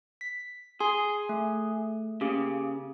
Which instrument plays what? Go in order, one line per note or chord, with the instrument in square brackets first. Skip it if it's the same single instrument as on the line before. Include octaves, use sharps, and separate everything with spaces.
[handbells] B6
[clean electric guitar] G#4 [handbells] C6
[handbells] A3
[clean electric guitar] C#3 [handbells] A#3 G4 G#4